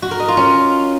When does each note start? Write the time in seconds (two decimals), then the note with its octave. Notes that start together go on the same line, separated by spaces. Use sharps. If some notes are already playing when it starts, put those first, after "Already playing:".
0.02 F#4
0.11 A#4
0.20 D#5
0.28 F4
0.37 C#4